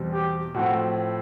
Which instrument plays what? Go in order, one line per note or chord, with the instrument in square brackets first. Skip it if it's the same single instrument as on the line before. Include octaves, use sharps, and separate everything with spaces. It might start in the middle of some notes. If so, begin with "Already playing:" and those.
Already playing: [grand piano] E2 B2 G3 C4
[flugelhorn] G4
[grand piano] A2 F3 A3 C4 [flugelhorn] F#4